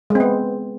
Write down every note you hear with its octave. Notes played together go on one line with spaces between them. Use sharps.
G#3 B3 C4